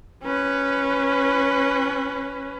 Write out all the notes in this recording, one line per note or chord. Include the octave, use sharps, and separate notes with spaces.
C#4 B4